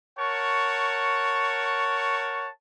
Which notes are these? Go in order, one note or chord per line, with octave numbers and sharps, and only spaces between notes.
A#4 C#5 F#5 A5 C#6